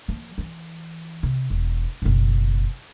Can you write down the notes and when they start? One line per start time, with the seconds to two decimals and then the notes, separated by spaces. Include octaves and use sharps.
0.08 F3 A#3
0.38 E3
1.23 C3
1.50 E1
2.02 F#1 B2